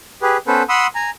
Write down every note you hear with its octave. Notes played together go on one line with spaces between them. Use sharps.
G4 G#4 B4
B3 C#4 A4 B4 C5
F#5 B5 C6 D#6 E6
G#5 A#5